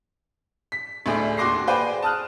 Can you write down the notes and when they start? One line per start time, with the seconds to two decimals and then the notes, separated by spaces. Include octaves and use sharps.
0.72 B6
1.06 D2 A2 A3 D4 G#4
1.37 D#2 F#4 C6 D6 A#6 C7
1.67 G#4 B4 C5 D5 G5
2.02 A5 D#6 F6 F#6